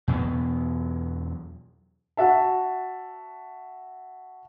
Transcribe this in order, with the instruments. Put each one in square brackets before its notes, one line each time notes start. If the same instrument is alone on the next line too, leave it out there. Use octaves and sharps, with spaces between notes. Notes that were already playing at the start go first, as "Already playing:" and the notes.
[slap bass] E2 B2 F#3 B3
[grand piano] F#4 E5 A5